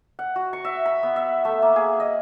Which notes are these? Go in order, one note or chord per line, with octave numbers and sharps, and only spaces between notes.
F#5
F#4
C#6
E5
B5
B3
E5
A3
A#3
G#4
D#5